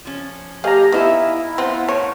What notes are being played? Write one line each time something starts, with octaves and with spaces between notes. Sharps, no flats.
F3 C#4
A3 G4 G#4 D#5 F5 G#5 A#5
B3 D#4 E4 C#5 D#5 E5
B3 C4 F4 F#5
A2 A#4 C#5